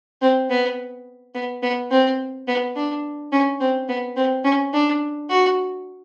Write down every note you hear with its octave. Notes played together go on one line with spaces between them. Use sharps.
C4
B3
B3
B3
C4
B3
D4
C#4
C4
B3
C4
C#4
D4
F#4